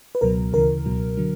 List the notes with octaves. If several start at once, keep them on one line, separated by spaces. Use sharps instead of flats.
B4
C#2 B2 F#3 A#4
D2 C#3 E3 A#4
C#2 B2 F#3
D3 F#3